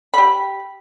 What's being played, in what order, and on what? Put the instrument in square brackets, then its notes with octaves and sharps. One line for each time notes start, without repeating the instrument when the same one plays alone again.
[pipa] G4 B5